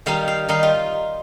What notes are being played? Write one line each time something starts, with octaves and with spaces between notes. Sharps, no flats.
D#3 G3 D#4 F5
F5
D#3 G3 D#4 F5
F4